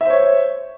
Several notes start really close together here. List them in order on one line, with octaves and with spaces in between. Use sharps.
E5 C5 C#5